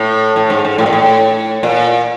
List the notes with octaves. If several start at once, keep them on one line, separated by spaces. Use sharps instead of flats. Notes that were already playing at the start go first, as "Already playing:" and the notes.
Already playing: A2
A2
G#2
G#2
A2
A#2
A2
A#2